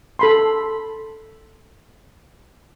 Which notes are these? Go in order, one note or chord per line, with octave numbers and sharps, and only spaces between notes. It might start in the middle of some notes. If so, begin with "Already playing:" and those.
A4 B5 C6